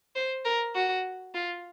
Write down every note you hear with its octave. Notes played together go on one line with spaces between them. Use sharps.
C5
A#4
F#4
F4